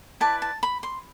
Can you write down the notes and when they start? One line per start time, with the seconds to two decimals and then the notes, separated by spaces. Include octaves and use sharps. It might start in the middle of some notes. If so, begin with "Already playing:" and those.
0.20 E4 B4 D5 A5
0.42 A5
0.63 B5
0.83 C6